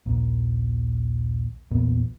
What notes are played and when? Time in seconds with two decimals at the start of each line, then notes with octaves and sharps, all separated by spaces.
0.06 A#1 D#2 A#2
1.71 A#1 E2 A#2 B3